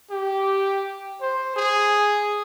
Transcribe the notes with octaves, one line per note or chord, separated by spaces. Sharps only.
G4
C5
G#4